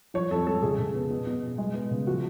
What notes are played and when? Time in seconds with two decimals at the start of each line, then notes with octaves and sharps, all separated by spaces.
0.14 F3 C#5
0.30 F2 A4
0.47 G#3 A4
0.62 C#3 G#4
0.78 C#3
0.95 B3
1.10 B2
1.27 B2
1.42 B2
1.58 G#3
1.74 B3
1.91 C#3
2.07 F3 F#4